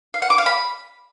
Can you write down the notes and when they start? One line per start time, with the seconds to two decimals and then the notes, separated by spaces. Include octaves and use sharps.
0.14 F5
0.22 F#5
0.30 D6
0.38 F5
0.46 B5